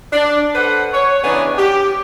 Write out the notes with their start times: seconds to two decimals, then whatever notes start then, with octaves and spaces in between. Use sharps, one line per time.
0.12 D4
0.55 A4 B4 C5 F#5
0.93 C#5
1.24 C#3 E3 B3 D4 D#4 G#4
1.58 G4